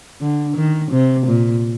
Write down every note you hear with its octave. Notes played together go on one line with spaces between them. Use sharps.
D3
D#3
C3
A#2